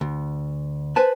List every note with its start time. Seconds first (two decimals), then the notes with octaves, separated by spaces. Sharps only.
0.01 D2
0.96 B4 C5 G#5 A5